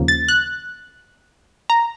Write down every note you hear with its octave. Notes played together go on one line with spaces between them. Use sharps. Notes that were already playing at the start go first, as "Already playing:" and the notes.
Already playing: D#2 C#3 F3 A#3
A6
F#6
A#5